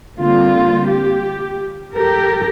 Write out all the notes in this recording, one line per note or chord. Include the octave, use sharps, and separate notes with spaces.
D3 G3 A#3 C4 F4
G4
G4 A4 A#4